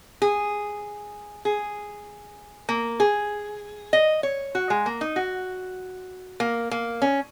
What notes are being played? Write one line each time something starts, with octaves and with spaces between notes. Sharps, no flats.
G#4
G#4
A#3
G#4
D#5
C#5
F#4
G#3
A#3
D#4
F#4
A#3
A#3
C#4